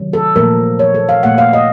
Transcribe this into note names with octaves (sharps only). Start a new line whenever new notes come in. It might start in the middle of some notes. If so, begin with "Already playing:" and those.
Already playing: C3 D#3 F#3
A4
A#2 F3 A3 A#4
C#5
A4
F5
A#2 A3 F#5
F5
D#5